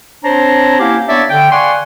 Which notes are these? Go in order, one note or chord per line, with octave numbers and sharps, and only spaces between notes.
C4 D4 C5 C#5 A#5
A#3 C#4 E4 G4 F5 F#5
B3 D4 C#5 D5 E5
D3 G5
D5 F5 F#5 G#5 C6 C#6